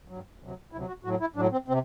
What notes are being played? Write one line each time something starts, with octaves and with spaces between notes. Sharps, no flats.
G2 F#3
D2 C3 F#3
D2 C3 F#3 E4
F#4
A2 F#3 F#4
E4
A2 F#3 D4
C4
C3 C4